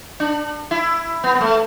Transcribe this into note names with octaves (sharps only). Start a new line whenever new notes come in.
D4
E4
B3
B3
A3